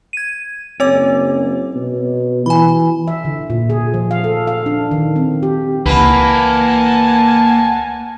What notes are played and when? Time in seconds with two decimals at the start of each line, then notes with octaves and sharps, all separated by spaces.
0.13 G#6 D#7
0.80 F#1 C4 C#5 D6
1.75 B2
2.46 E3 G#5 B5
3.08 E5
3.25 D3
3.50 A#2
3.70 G#4
3.94 F3
4.11 F5
4.24 A4
4.47 F5
4.66 D4
4.91 D#3
5.16 C4
5.43 G4
5.86 C#2 E3 A#3 B4 F#5 G#5 A5